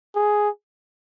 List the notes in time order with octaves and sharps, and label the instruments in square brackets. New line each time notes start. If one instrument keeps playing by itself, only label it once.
[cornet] G#4